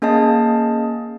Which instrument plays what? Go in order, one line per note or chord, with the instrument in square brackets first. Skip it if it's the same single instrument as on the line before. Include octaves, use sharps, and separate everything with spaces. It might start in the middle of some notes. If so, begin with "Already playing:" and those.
[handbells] A#3 C#4 G#4 D#5 F5 A5